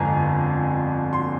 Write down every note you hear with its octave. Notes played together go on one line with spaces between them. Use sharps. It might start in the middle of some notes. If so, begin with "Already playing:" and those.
Already playing: G1 F2 D3 G#3 G#5 A#5
C6